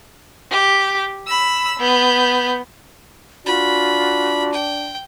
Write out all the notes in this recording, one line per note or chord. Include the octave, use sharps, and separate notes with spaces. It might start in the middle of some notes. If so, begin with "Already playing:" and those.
G4
B5 E6
B3 G6
D4 F4 F#4 B5
G5